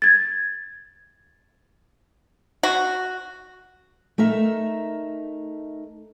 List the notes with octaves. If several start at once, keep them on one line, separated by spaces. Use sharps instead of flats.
G#6 A6
F#4
A3 D#4 A#4 E5